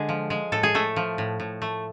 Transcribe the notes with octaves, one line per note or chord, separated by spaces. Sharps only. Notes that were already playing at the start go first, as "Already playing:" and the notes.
Already playing: D3 G#3 G#4
F3
G#3
A2 A4
G#4
A2 A3 A4
F3
A2
A2
A3